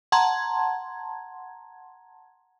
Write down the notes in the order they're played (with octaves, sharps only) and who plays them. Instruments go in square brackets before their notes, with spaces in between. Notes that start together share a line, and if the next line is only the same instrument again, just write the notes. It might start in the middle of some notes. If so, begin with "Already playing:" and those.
[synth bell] F#5 A5 A#5 C6 G#6